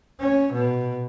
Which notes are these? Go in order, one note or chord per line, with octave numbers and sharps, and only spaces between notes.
C#4
B2